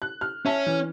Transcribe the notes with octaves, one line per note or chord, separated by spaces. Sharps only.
F#6
F6
C#4 E5 A5
E3